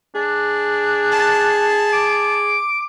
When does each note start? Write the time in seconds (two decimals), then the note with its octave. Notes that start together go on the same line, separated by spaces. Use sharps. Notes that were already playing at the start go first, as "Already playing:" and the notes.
0.15 D4 G#4
1.12 A5
1.93 D6